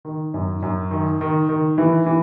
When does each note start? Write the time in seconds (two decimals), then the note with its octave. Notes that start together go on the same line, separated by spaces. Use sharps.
0.05 D#3
0.34 F#2
0.62 F#2
0.91 D#3
1.21 D#3
1.49 D#3
1.78 E3
2.06 E3